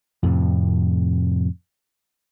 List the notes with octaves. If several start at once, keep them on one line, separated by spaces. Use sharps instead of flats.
F2 A2 C3